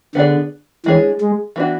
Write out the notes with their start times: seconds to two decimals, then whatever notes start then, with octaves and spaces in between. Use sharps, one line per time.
0.15 D3 B3 D4 G#4 D5
0.86 E3 G#3 D4 G#4 C#5
1.21 G#3
1.56 E3 B3 D4 F#4